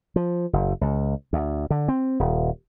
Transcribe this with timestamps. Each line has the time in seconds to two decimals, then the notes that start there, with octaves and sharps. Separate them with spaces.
0.16 F3
0.53 F#1
0.81 C#2
1.33 D2
1.70 D3
1.88 C4
2.20 D#1